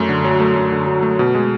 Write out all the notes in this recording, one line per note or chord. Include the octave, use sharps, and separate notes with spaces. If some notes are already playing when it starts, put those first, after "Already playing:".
Already playing: F#2 A3
D3
F#3
A3
F#2
D3
F#3
A3
B2
G#3